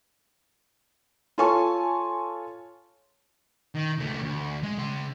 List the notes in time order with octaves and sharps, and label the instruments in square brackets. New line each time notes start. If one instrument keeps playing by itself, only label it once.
[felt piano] F4 A4 C#5 G#5 A5 C#6
[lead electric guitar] D#3
C#2 A3
D2
G#3
C#3 C6